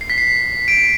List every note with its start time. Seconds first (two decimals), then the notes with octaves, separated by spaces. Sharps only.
0.01 C7
0.10 B6
0.18 C7
0.68 D7